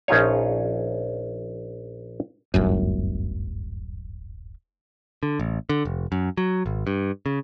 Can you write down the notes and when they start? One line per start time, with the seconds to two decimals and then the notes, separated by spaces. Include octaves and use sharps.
0.08 A#1 C#4 D#4 F4 G#4 C#5
2.54 D1 G1 F#2
5.23 D3
5.39 A1
5.69 D3
5.85 F1
6.12 F#2
6.37 F#3
6.66 G#1
6.87 G2
7.26 C#3